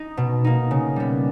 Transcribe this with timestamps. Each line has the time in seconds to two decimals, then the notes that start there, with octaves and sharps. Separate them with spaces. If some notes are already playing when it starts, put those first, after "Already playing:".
Already playing: D#4
0.17 B2
0.45 A#3 D#4
0.71 C#3
0.96 G3 B3